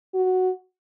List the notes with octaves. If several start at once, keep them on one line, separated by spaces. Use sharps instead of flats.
F#4